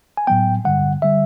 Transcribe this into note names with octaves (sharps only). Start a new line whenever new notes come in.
G#5
A2 F#3 B3 G5
G2 D3 G3 F#5
D3 G3 E5